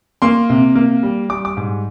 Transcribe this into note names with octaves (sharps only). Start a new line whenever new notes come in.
A#3 C6
C3
A#3
G3
G3 D6
D6
G#2